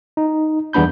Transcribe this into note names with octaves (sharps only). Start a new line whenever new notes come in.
D#4
E2 G3 B3 D4 B5 G6